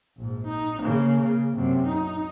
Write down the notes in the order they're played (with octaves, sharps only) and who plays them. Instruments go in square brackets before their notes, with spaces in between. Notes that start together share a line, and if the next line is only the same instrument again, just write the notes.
[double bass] A#1 G#2
D#4
C#3 A#3
C#3
F#2 C3
D#4